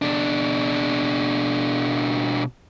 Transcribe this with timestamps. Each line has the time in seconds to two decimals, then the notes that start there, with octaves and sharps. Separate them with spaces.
0.02 B2 D4